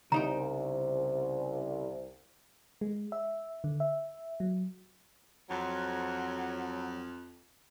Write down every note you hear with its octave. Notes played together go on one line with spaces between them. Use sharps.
C2 C#3 D#4 G5 A#5
G#3
E5
D3
E5
F#3
F2 F#3